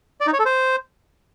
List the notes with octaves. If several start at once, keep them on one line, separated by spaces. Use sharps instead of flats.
D5
D#4
C#5
A4
C5